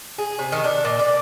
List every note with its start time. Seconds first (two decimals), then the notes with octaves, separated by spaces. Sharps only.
0.18 G#4
0.39 C3
0.52 D#3
0.64 D4
0.85 A#2
0.99 D5